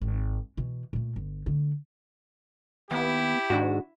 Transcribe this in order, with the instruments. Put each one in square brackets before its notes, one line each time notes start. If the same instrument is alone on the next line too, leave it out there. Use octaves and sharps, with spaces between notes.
[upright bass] G#1
B2 E3
A#2 A3
G1
D3 A3
[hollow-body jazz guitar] D#2 [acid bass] B3 [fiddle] E4 [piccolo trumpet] G4
[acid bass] G#2 [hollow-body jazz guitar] D#3 D4 F#4